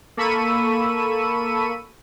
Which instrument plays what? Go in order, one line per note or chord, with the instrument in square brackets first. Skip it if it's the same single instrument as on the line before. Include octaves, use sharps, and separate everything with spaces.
[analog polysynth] A#3 A4 B5 C#6 E6 D#7